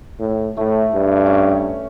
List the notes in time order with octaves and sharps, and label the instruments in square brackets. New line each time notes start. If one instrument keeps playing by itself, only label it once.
[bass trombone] A2
[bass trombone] A2 [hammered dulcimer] A3
[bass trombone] G2
[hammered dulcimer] C#4